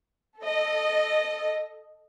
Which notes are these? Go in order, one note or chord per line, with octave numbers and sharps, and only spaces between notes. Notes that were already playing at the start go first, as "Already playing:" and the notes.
A4 D#5